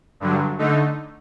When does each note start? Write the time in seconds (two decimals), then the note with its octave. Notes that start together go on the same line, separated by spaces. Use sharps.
0.20 G2 D3 F#3
0.59 D3 A3 D#4